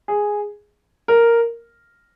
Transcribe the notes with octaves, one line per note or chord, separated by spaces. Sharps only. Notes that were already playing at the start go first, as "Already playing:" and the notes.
G#4
A#4